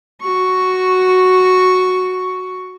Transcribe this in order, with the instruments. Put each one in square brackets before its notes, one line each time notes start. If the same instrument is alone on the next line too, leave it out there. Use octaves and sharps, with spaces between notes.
[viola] F#4 C#6